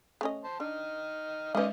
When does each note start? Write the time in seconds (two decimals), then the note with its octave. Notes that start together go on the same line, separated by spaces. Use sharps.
0.21 A3 C#4 D#5
0.44 C5 A5
0.60 D4 D#4 F6
1.55 D#3 G#3 C#4 F4 B4 D5 D#5